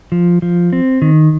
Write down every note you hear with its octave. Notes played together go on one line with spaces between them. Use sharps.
F3
F3
C4
D#3